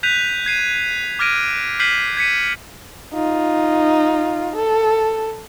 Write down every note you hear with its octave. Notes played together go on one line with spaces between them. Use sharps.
F#6 G6 B6 D#7 F7
G#6 C7 D#7
D6 F6 G#6 A#6 D7 D#7
F6 G6 B6 C7 D#7 F#7
G#6 B6 C#7 D#7
D#4 F4
A4